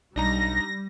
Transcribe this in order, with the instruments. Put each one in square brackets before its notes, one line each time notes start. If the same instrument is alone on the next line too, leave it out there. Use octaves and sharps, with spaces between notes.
[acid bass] B1 [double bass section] G3 [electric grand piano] D4 D#4 A#5 [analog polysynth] A#6